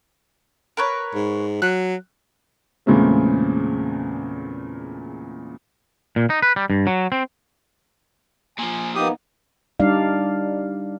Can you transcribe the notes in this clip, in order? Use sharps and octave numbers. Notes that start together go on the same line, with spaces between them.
A#4 B4 C#5
G#2
F#3 F#6
E2 A#2 C#3 G#3 A3 C4
A#2
D#4
B4
G3
G2
F#3
C4
A#2 F3 G#5
A#3 B3 D#4 G4 D#6
G3 D4 D#4 D5 F5